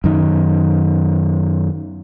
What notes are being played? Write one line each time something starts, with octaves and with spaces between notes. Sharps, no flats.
F#2 D#3